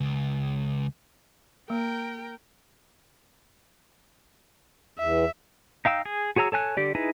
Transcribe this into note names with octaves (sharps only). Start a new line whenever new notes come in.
C#2
A#3 A#4 G5
E2 E5
D#4 F5 G5 E6
G#4
F#4 G#4 C#5 A#5 E6
A4 C#5 G#5 F#6
D3 G4 D5
D#4 E4 G#4 B4